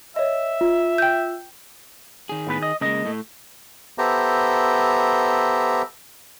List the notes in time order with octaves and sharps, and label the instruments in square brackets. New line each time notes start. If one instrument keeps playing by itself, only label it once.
[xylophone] C#5 D#5 [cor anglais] E5
[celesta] F4
[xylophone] G5 G6
[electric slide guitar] D#3 G#4
[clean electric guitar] A2 B3 B4
D#5
[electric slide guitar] C#3 G#3 [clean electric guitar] A#3 D#5
[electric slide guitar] A2 A3
[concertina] B3 G4 A4 C5 E5 A#5